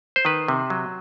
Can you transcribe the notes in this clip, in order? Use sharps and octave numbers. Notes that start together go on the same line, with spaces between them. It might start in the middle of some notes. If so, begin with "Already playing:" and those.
C5
D#3 B4
C3
F#3